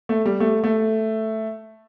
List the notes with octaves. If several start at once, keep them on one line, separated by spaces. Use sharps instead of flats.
A3
G3
A3
A3